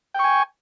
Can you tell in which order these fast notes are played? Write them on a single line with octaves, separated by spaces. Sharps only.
G5 C#6 G#5